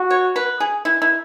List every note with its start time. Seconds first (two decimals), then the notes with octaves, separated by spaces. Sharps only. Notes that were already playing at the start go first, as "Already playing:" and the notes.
Already playing: F#4
0.10 C#5
0.36 B4
0.60 G#4
0.85 E4
1.02 E4